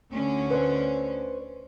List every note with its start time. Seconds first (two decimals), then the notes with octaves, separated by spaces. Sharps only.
0.12 D2 D3 C#4
0.50 B4 C5 D5